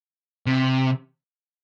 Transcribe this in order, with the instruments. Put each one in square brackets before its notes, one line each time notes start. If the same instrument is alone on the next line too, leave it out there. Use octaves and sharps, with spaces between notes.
[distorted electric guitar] C3